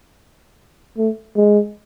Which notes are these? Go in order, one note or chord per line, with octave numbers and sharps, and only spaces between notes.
A3
G#3